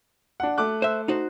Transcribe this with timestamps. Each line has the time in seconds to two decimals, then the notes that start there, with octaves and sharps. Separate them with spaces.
0.40 D4 F#5
0.58 A3 D6 F#6
0.82 C5 E5
1.08 D#4 F#4 C5